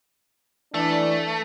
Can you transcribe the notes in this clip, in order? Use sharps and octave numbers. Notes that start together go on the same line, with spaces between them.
E3 A3 D4